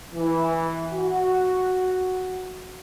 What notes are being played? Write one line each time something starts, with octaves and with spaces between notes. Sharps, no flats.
E3
F#4